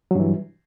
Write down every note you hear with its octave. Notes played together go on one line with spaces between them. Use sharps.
G2 E3 F#3